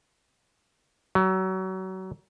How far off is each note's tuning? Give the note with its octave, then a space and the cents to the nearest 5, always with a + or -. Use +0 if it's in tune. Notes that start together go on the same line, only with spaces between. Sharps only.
F#3 +30